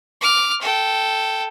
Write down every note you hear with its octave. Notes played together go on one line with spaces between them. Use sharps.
D6 F6
A4 G5